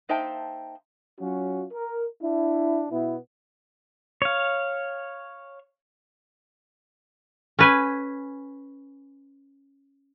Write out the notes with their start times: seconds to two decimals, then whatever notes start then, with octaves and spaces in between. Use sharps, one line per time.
0.09 A#3 D#4 C5 E5 G5 A5
1.20 F#3 C#4 F4 F#4
1.71 A#4
2.20 D4 E4
2.90 B2 B3 E4
4.22 C#5 F5
7.59 C#4 B4 G#5